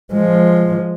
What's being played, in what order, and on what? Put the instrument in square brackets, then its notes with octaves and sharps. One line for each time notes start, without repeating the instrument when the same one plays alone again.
[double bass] F3 G#3